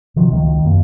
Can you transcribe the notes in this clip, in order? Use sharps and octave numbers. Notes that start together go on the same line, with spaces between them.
C3 D#3 F3 F#3
C#2 D#3 A#3
F#2 A#3